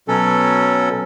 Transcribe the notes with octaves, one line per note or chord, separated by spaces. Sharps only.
B2 F#3 C#4 A4